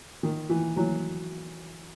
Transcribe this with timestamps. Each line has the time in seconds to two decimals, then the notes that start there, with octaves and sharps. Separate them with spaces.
0.23 D#3
0.50 E3
0.76 E3 F#3